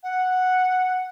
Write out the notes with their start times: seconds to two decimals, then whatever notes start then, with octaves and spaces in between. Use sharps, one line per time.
0.03 F#5